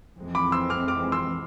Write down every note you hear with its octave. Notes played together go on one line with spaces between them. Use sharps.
F2 E3 G#3 C4
B5 D6
C6 E6
D6 F6
D6 F6
C6 E6